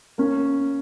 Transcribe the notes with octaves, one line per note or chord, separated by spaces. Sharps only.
A#3 C#4